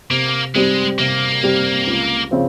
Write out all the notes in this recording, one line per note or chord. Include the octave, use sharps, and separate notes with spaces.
C3 A#3
G3 G#3 C4 G4
C3 A#3
G3 C4 G4
C#2
C#3 F3 C4 F4